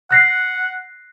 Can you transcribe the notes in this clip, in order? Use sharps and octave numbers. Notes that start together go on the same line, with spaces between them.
F#5 F#6 A#6 C7